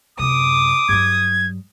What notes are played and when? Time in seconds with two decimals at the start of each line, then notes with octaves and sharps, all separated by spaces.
0.19 F#2 C3 D6 D#6
0.89 G2 F#3 G#6